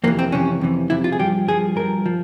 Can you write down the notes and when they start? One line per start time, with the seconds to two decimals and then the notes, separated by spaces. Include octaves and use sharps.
0.04 F2 C3 E3 A#3
0.19 C4
0.32 F2 C3 E3 C#4
0.61 F2 C3 E3
0.90 F2 C3 E3 E4
1.04 F4
1.12 G#4
1.19 G2 F3 G4
1.48 G2 F3 G#4
1.76 G2 F3 A#4
2.06 F3